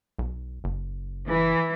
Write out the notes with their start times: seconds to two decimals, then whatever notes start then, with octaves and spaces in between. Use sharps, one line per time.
0.19 B1
0.64 F#1
1.28 E3